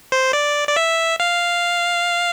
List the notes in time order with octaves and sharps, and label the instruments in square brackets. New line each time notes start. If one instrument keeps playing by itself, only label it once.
[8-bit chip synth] C5
D5
D5
E5
F5